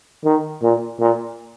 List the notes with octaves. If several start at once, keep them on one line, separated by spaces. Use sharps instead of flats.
D#3
A#2
A#2